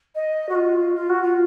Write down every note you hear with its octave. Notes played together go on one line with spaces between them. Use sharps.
D#5
F#4
F4
F4
F#4
F4